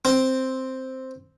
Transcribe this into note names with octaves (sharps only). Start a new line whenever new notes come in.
C4